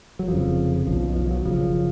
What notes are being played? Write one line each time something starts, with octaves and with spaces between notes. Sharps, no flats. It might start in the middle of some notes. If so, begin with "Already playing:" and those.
F#3
F1 F2 C#3 F3
B1 B2 F3
D#3
F3
F#3
F#1 F#2 C#3 F3